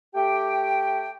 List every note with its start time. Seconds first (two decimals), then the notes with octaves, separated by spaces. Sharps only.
0.15 A3 G4 G5